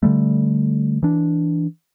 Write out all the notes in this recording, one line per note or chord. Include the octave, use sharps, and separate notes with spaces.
D3 E3 G3 A3
E3 D4